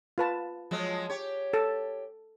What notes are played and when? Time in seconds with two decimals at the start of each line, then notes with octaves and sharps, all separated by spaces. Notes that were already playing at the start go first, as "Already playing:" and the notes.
0.18 F4 B4 A5
0.71 F3 F#3 G#3
1.10 G4 C#5
1.53 A4 A5